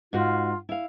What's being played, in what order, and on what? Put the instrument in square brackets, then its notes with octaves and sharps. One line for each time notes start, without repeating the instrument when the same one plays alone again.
[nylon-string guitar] G#2 F#4 [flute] F4
[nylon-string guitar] E4 F5